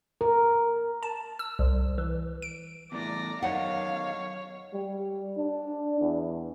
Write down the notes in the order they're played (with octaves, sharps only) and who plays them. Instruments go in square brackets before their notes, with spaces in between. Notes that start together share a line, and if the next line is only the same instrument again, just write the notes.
[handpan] A#4
[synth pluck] A5
E6
C2
E3
D7
[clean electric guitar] E2 A2 [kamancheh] D5 A#5
[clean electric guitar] F#2 D#3 D#4 [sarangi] C#5 [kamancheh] F5 [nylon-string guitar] F#5
[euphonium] G3
D4
E2